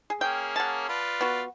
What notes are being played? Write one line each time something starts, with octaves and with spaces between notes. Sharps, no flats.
G#4
A#3 C#4 G#4 G5
F#5 A5
F4 B4 D5
B3 F#4